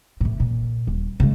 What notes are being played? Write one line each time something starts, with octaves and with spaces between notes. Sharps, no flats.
A2 E3
A#2
D#1
C#3 G#3